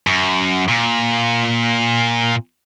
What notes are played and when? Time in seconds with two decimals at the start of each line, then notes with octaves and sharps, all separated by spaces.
0.07 F#2
0.68 A#2